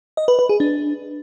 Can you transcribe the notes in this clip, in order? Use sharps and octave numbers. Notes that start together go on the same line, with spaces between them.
D#5
B4
B4
G#4
D4